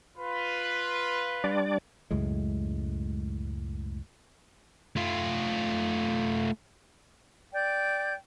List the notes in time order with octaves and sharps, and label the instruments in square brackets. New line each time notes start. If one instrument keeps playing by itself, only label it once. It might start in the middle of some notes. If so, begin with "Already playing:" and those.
[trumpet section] F4 B4
[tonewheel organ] G3 D4 D5
[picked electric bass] C#2 F#2 A2 G#3
[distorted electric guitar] A3 F4
[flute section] D5 G5 G6